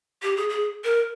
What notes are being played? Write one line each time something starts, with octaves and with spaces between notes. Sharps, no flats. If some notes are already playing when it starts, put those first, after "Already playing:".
G4
G#4
G#4
A#4